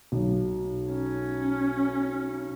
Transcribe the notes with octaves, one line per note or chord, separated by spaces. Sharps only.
B1
C#4